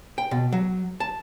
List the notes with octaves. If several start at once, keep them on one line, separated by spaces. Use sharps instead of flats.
G5
B2
F#3
A5